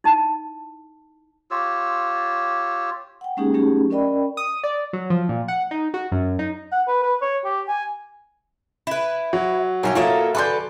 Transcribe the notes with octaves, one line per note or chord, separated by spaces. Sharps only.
D#4 E4 A5
F4 G4 C#5 E6
F#5 G5
G#3 A#3 C#4 D#4 G4 G#4
F#3 A3 C#4 D#4 G4 G#4
C#4 A#4 D5 D#5 G5 B5
D#6
D5
F#3
F3
A#2
F#5
D#4
F#4
F#2
D#4
F#5
B4
B4
C#5
G4
G#5
E4 B4
F#3
B1 A#4 C5 C#5 G5 G#5
A#3 F4 A4 C#5 D#5 E5
D3 A4 B4 G#5 C6 G6